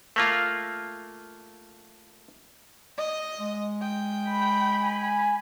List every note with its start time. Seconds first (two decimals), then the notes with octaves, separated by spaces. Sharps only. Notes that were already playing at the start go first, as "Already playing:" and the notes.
0.16 A3 A#3 F4
2.98 D#5
3.40 G#3
3.82 G5
4.28 B5
4.81 G#5